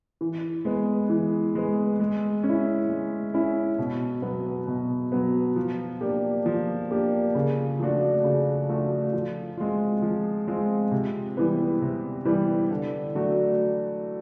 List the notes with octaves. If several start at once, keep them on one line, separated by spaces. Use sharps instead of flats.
E3
G#3 B3
E3
G#3 B3
G#3
C#4
E4
G#3
C#4 E4
B2
F#3 B3
B2
F#3 B3
F3
A#3 D4 G4
F3
A#3 D4 G4
C#3
F3 A3 D4 F#4
C#3
F3 A3 D4 F#4
F3
G#3 C4 F4
F3
G#3 C4 F4
C3
E3 G3 B3
C3
E3 G3 B3
D3
F#3 A3 D4 F#4